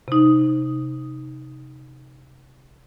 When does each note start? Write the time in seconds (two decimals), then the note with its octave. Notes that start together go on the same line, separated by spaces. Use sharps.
0.08 C3 D#4